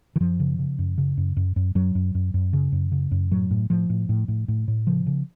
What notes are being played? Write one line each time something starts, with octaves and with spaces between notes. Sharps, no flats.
D#3
F#2 F3
C#3
C#3
F#2
C#3
F#2
F#2
F#2
F#2 F#3
F#2
F#2
F#2
C#3
F#2
C#3
F#2
A2 F#3
A2
A2 F3
A2
A2
A2
A2
A2
C#3 F3
C#3